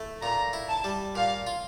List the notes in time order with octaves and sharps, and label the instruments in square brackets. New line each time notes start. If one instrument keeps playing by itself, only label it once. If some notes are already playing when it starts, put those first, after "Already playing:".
Already playing: [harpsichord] A3 E4
[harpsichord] A#2 [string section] A#5
[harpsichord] E4
[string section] A5
[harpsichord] G3
[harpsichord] A#2 [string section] F5
[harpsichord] F4